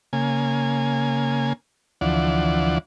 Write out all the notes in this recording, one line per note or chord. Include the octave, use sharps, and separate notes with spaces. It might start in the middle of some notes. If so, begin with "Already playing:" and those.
C#3 A#3 G#5
D2 E3 F3 D5 F#5